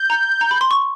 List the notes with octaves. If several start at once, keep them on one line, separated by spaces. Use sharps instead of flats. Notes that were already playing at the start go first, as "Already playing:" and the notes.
Already playing: G6
A#5
A#5
B5
C6
C#6